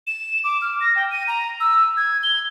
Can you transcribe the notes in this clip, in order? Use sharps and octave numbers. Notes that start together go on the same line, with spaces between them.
E7
D6
F6
A#6
G5
D#7
A#5
E6
G#6
G7